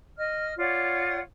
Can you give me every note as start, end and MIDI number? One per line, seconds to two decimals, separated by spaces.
0.17 0.52 75
0.17 0.52 89
0.57 1.19 65
0.57 1.19 73
0.57 1.19 74
0.57 1.19 78